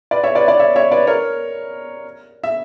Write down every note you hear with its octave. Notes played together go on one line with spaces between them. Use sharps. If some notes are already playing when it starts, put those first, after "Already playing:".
B4 D5
C#5 E5
B4 D5
B4 D5
C#5 E5
C#5 E5
B4 D5
A#4 C#5
E5